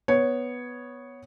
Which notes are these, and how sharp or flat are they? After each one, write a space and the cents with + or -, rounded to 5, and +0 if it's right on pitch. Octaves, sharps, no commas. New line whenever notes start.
B3 +0 C#5 +0